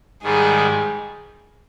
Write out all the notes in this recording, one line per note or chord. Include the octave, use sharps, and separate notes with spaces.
G#2 D#3 G3 G#4